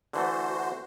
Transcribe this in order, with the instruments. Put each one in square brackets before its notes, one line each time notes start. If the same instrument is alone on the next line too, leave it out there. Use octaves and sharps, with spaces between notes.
[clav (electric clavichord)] D3 E3 A3 [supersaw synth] F#4 C5